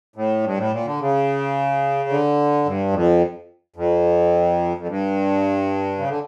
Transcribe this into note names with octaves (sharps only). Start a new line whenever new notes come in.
A2
G2
A2
A#2
D3
C#3
D3
G2
F2
F2
F2
G2
C#3
D3